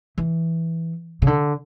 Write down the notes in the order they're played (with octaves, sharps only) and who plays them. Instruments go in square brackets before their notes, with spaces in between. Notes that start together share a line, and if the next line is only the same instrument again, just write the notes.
[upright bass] E3
C#3
D3